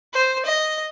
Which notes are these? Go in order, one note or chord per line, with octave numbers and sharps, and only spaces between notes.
C5
D#5